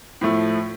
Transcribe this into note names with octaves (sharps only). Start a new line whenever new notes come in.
A2 F3 A3